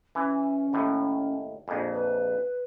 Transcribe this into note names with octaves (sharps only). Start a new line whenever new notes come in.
E3 C#4
D#2 A2
A#1 F2
B4